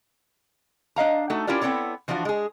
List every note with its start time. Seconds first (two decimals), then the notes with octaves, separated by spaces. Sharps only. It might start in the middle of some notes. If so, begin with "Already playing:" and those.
0.96 D4 D#5 F5 A#5
1.30 A3 D#4 F#4 A4
1.47 C#4 E4 F4 G4 A#4 D5
1.61 B3 C4 E4 A4 C#5
2.08 E3 F3 D4 F4 F#4
2.25 G#3 G#4